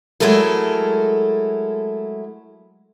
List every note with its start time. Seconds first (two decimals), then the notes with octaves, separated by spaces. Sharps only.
0.20 F#3 G#3 A3 E4 A4 A#4